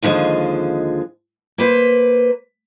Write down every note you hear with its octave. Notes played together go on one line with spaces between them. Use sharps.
D#2 D3 F3 G#3 D#5
A#3 B4 C5